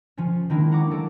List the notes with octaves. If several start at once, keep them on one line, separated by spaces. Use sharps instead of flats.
F3 C#4
D#3 F3 G#3 A#3 D4 E4
F#5 A#5 C#6 D6
F#3 A4 D7